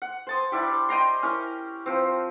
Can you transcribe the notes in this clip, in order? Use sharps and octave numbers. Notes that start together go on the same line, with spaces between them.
F#5
C5 A5 D#6
G3 D4 E4 G4
D#5 G5 A#5 C6
C#4 E4 A#4
F3 C4